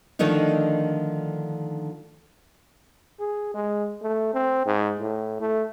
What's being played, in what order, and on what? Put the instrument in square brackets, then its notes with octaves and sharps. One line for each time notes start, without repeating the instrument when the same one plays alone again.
[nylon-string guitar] D3 D#3 F3 A3 D4 D#4
[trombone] G#4
G#3
A3
C4
G#2
A2
A3